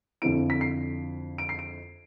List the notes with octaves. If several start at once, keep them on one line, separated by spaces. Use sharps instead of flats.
F2 D3 F3 C4 E4 D7
B6
C7
D7
C7
D7